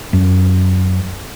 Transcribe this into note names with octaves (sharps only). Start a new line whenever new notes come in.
F#2